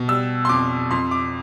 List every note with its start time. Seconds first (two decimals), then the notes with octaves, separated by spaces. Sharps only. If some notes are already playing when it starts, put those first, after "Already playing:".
Already playing: B2
0.08 G3 E6
0.45 C6
0.49 F2 D6
0.91 F2 C6
1.11 D6